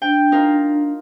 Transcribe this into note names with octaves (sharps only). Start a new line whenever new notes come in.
D4 G5
D#4 F4 A#4